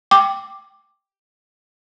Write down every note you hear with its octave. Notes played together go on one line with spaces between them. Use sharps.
G5 D6